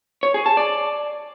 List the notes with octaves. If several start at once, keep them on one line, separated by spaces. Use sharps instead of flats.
C#5
G#4
A5
D5